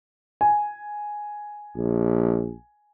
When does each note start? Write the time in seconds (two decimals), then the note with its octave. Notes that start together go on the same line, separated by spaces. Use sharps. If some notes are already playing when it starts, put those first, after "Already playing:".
0.41 G#5
1.77 A#1